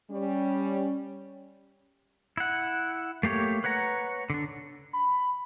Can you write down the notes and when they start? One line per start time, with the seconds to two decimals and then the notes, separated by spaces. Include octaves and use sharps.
0.10 G3 C#4
2.37 E4 F#5
3.23 A3 A#3 G4 C#5
3.64 B4 C#5 F#5 A#5
4.30 D3 D4
4.93 B5